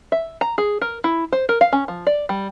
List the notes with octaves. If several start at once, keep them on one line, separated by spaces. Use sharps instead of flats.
E5
A#5
G#4
A#4
E4
C5
A#4
F5
C#4
F3
D5
G3